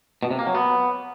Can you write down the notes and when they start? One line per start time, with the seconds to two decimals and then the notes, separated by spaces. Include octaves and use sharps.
0.23 B2
0.31 C3
0.39 A#3
0.47 F#3
0.55 B3